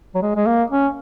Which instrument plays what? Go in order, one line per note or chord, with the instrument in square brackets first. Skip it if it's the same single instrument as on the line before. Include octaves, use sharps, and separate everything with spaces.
[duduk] F#3
G#3
G#3
A#3
C#4